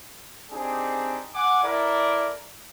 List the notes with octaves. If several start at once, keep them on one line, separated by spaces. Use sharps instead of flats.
C4 D4 D#4 G4 G#4
F#5 G#5 D6
E4 A4 A#4 D5